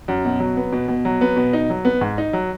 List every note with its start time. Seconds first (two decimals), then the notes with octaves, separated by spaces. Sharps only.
0.08 F#2
0.25 B2
0.40 F#3
0.57 B3
0.73 B2
0.88 B2
1.05 F#3
1.21 B3
1.36 B2
1.53 D#4
1.70 F#3
1.85 B3
2.01 G#2
2.18 D#4
2.33 F#3